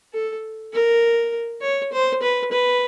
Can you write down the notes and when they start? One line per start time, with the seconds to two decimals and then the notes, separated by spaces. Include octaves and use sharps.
0.13 A4
0.73 A#4
1.62 C#5
1.92 C5
2.22 B4
2.52 B4